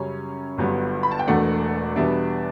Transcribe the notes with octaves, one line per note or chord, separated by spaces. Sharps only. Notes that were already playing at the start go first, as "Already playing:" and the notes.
Already playing: F#2 C#3 G3 C#4
G1 G2 F#3 B3
B5
A5
G5
E1 E2 B2 A3 D4 F#5
E2 B2 G3 B3 D4 E5